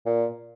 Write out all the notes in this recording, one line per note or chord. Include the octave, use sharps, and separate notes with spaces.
A#2